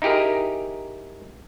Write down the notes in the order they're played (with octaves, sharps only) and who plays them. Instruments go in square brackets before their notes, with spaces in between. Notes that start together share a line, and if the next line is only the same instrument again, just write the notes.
[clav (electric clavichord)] D#4 E4 G4 G#4 A#4